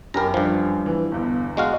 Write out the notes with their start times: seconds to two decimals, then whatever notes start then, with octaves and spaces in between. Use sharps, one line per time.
0.14 F#2 G4 A#4 A#5 B5
0.34 G2 F3
0.86 E3
1.12 G1 E2 G2
1.57 G#3 F#4 F5